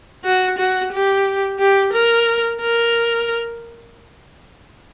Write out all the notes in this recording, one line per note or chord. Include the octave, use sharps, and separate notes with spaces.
F#4
F#4
G4
G4
A#4
A#4